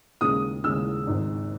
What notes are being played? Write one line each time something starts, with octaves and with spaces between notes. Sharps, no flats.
D#2 C#3 G#3 C#4 D#6
D#2 C#3 G#3 C#4 E6
G#1 G#2 D#3